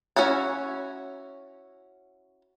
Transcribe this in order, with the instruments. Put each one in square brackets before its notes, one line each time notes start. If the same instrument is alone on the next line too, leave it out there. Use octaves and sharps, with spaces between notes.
[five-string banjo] C#4 E4 F#4 C#5